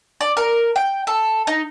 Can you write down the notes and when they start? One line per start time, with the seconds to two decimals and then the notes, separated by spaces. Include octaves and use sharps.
0.21 D5
0.37 A#4
0.76 G5
1.07 A4
1.47 D#4